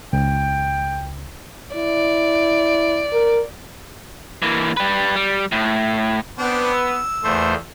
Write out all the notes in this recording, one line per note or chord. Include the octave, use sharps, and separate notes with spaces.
C#2 G5
E4 D5
A#4
E3 A#3
G3 B4
G3
A2
B3 C4 D4
E6
E2 A#2 A3 C5